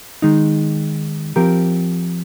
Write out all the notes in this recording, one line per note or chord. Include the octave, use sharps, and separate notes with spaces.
D#3 G#3 D#4
F3 C4 G4 A#4